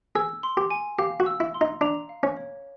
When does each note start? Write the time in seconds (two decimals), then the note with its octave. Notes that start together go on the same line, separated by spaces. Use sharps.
0.16 G#4 E6
0.43 C6
0.57 G4
0.71 G#5
0.98 G4 F5
1.20 F#4
1.26 E6
1.40 E4
1.54 C6
1.61 D#4
1.81 D4 A#5
2.09 F5
2.23 C#4
2.37 C#5